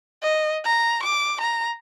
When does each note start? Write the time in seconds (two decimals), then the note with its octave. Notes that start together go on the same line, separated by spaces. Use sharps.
0.22 D#5
0.64 A#5
1.03 D6
1.41 A#5